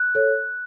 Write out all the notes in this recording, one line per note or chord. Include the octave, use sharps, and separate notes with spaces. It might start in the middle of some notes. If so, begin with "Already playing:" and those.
Already playing: F#6
A4 C#5